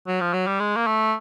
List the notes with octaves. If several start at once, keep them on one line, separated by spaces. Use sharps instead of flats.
F#3
F3
F#3
G3
G#3
A#3
A3